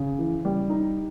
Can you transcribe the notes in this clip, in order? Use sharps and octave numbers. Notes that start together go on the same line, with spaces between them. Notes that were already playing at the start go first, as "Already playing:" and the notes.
Already playing: C#3
E3
G3
D#4